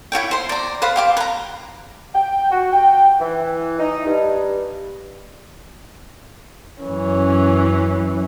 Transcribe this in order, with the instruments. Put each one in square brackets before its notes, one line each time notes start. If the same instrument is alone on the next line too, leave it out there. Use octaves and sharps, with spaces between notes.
[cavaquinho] E4 F#4 C#5 G5
C5 C6
D5 A#5
B4 C5 F5 B5
G4 F5 D6
B4 A#5
[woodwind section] G5
F#4
G5
E3
D#4
G2
[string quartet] F#2 E3 C#4